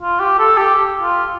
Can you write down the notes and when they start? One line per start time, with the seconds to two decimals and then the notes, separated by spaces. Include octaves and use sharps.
0.01 F4
0.20 G4
0.39 A4
0.57 G4
1.02 F4